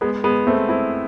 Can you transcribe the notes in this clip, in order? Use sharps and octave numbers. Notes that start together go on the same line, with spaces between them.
G#3 B3
G#3 B3
A3 C4
C4 E4